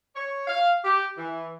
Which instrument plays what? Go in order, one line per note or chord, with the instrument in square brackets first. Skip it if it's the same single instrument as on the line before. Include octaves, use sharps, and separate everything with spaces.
[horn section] C#5
F5
G4
E3